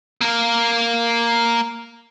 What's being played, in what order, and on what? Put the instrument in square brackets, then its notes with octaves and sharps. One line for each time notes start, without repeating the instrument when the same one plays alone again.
[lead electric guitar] A#3 A#4